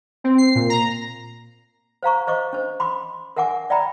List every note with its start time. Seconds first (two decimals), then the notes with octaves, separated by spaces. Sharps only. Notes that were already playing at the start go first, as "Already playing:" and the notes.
0.24 C4
0.38 C7
0.55 A#2
0.70 A#5
2.03 C5 F5 A#5 C#6
2.27 C5 D#5 C#6 D6
2.53 C#4 C5
2.80 B5 C6 D6
3.36 A#4 E5 F#5 G#5 D6
3.70 D5 E5 G5 A#5 B5